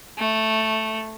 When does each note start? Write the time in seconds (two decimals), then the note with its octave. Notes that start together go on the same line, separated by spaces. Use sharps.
0.18 A3